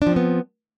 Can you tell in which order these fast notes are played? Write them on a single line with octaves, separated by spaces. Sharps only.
D4 F3 C4 B3